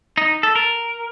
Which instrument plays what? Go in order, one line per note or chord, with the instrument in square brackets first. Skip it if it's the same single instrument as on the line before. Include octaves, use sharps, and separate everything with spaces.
[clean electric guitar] D#4
A4
A#4